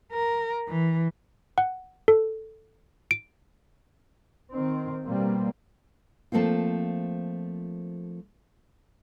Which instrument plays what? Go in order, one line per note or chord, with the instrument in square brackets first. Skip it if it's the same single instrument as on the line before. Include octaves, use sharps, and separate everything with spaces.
[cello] A#4
E3
[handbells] F#5
A4
D7
[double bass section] D#3 C4
B2 G3 A#3 C4
[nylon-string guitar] F3 A3 A#3 C4 F4